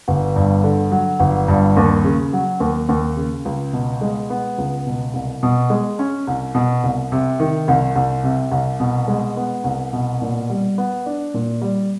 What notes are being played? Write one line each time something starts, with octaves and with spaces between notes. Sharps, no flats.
G1
G2
D3
F#3
G1
G2
D#2
C#3
F#3
D#2
D#2
C#3
C#2
B2
G#3
B3
C#2
B2
C2
B2
G#3
C#4
C2
B2
C2
C3
D#3
C2
C2
C3
C2
B2
G#3
B3
C2
B2
A#2
G3
B3
D4
A#2
G3